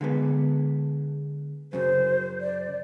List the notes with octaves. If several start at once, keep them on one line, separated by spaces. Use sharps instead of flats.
D3 G#3 B3
F#2 C#3 C5
D5